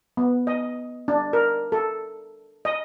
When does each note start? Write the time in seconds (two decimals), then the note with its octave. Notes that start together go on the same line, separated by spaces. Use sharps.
0.17 B3
0.47 D#5
1.08 D4
1.33 A#4
1.72 A4
2.65 D#5